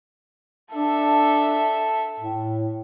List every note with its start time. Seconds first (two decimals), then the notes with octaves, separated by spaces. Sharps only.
0.74 D4 A4 E5
2.20 A2